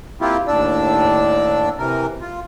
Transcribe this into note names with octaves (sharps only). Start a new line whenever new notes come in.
A#3 C4 E4 F4 G4
D#2 A2 D4 D5 E6
C3 E3 A#4
F4